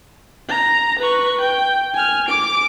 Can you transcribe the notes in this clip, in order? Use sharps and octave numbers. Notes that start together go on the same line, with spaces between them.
A#5
B4 C#6
G5
G#5 F6
D6 D7